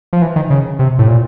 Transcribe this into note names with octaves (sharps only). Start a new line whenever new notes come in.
F3
E3
D#3
C#3
C3
A2
A#2